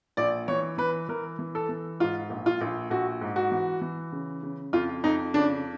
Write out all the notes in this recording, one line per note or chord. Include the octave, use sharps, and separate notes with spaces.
A#1 D5
E3 C#5
E3 B4
E3 A#4
E3
A4
E3
G#2 F4
A#1
F4
A#1
A#1 F#4
G#2
F#4
E3
E3
C#3
C#3
F2 F4
F2 D#4
C#3 D4